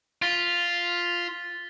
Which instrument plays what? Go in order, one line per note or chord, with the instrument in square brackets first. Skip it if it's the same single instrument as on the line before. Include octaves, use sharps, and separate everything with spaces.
[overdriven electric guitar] F4 [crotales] A6 B6 G7